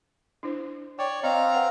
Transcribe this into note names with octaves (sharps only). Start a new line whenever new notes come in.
D4 E4 C5
C#5 D5 G5
C4 D#5 F5 A#5
B4 F#5